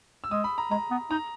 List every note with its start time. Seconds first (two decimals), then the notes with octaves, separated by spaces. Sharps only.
0.24 E6
0.31 G#3 D#6
0.44 B5
0.58 A#5
0.70 G#3 A#5
0.91 B3
1.11 D#4 A#5